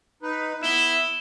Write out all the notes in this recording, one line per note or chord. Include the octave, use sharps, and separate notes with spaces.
D#4 B4
B3 E4 E7 G7